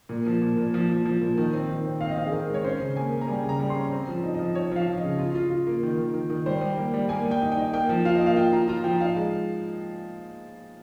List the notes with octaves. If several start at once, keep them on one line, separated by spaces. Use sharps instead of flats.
A#2
F3
A#2
A#2
F3
F3
F3
A#2
D#3
C4
D#3
C4
C4 F5
D#5
C4 F5
G#4
D#3 A#4
G#3
C#5
C#4 C5
C#3
A#3 G#5
A#3
A#5
G3 G#5
C#3
A#5
G3
C6
C#4
C4 A#5
F3
D#4
F3 D#5
D#4 C#5
F3 F5
F3
D#5
C#3
F4
F4
F4
A#3
D#3
D#3
D#3
D#3
G3 C5
G3
A#3
G3
A#3 G#5
G3
G5
D#4
G5
D#4
A#3 G5
F3
F4 F5
D#5
A#3
F5
F4 G5
F4 A#5
F4 A#5
F3 G5
D#4 F5
G#3